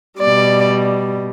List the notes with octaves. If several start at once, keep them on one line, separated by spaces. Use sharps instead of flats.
B2 G3 D5